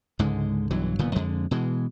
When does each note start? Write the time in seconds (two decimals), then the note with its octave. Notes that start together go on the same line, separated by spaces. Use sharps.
0.19 C#2 G#2 D3 G#3
0.70 B1 G2 E3 F#3
0.99 F#1 A#2 D#3 B3
1.15 F2 D3 G#3
1.51 B2 E3 G#3